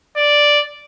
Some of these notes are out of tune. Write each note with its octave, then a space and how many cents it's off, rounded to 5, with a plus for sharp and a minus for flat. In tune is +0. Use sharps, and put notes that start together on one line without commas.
D5 +0